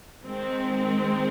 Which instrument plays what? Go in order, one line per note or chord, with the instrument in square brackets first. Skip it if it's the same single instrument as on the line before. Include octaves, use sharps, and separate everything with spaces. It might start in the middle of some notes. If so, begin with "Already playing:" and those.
[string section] D#3 G#3 C4